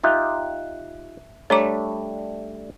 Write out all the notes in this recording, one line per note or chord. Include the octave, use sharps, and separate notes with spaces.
D#4 F4 G4 E5 F#6
G3 A3 D4 C#5 A#5 D6